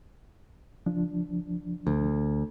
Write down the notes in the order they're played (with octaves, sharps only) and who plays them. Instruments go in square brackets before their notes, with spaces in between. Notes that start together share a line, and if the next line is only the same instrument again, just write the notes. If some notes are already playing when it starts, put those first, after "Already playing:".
[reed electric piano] C#2 F3 D4
[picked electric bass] D2